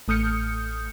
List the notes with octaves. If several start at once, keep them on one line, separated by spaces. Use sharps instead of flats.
A1 A3 D#6 F6 G6 C#7